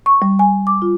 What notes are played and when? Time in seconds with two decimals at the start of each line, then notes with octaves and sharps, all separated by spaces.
0.06 C#6
0.22 G3
0.39 G#5
0.67 D6
0.82 F4